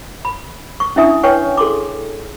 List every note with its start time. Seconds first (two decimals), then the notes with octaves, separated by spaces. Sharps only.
0.25 B5
0.80 C#6
0.96 C#4 D4 E4 E5 G#5 D#6
1.23 B4 C#5 G5 G#5 C#6
1.57 G#4 A4 C6 D6